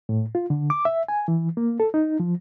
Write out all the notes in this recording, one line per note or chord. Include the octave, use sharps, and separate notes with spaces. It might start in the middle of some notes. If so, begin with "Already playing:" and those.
A2
F4
D3
D6
E5
G#5
E3
A#3
A4
D#4
F3